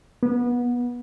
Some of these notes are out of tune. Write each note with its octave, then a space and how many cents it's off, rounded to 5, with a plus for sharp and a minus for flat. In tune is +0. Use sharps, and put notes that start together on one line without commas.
B3 -25